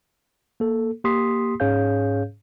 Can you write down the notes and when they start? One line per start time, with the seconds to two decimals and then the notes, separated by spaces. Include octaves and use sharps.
0.60 A#3 A4
1.04 A#3 G4 C6 D#6 B6 C7
1.60 G#2 C#4 G#4 C#5 F5 G6